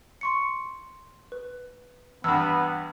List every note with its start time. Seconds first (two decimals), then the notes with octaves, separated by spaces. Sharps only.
0.21 C6 C#6 C#7
1.32 B4
2.24 E2 G2 B3 E6